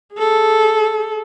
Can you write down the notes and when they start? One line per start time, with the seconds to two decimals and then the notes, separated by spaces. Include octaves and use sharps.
0.14 G#4 A4